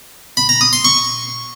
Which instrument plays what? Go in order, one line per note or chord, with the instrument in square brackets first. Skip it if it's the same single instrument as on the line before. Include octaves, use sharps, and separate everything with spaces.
[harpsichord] B5
A#5
D#6
C6
C#6